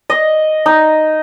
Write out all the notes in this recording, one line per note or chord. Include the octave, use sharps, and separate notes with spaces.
D#5
D#4